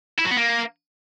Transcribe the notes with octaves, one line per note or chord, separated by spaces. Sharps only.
E4
F#3
B3
A#3